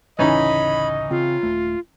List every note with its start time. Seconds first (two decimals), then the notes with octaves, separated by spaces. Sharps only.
0.19 A1 D2 C#3 E3 C#4 D#4 D#5 B5
1.10 C#3 C4 F4
1.43 D#1 A3